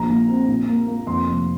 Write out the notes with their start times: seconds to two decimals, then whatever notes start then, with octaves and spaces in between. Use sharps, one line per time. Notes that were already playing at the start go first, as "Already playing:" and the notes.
Already playing: A#1 A#5
0.09 A#2
0.28 C4
0.48 A#2
0.68 A#3
0.87 A#3
1.07 F2 C6
1.27 F1